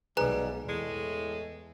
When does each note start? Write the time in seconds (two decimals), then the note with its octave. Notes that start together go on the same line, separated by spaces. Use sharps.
0.17 B1 G#2 G3 G#4 B4 G#5 A#5 F#6
0.68 E2 A2 G#3 A3